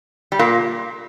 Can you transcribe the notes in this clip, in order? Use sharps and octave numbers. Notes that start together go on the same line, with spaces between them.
G3
A#2 A#3